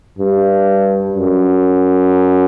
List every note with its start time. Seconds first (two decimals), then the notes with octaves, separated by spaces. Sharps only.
0.18 G2
1.13 F#2